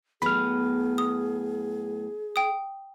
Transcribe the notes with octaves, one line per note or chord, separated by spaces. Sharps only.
A2 F#3 B3 G#4 B5 F6
D#6
G5 D#6